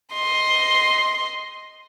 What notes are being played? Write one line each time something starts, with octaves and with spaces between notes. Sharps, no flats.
D#5 C6